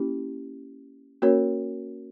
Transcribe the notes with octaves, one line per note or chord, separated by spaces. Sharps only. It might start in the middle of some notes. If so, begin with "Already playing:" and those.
Already playing: A#3 C#4 E4 G4
A#3 C#4 F#4 A#4 C#5